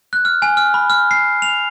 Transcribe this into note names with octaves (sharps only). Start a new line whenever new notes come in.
F#6
F6
G#5
F6
B5
F6
C7
F7